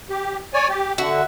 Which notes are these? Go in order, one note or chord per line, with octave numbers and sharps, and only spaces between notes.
G4
C#5 D5 G#5
G4
D3 F#4 E5 F#5